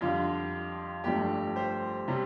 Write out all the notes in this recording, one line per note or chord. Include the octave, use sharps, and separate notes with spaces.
F2 D3 G3 D4 F4
G1 G2 F3 A3 D4 G4
G4 C5
C3 G3 C4